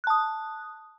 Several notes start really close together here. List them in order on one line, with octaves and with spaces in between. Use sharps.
F#6 A5 D#6